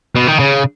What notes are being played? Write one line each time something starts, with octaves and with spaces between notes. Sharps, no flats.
B2
D#3
C#3